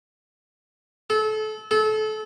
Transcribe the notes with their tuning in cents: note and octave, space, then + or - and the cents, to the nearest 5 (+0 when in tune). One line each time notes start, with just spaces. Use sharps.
A4 -30
A4 -30